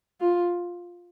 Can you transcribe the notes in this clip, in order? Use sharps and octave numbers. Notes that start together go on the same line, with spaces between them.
F4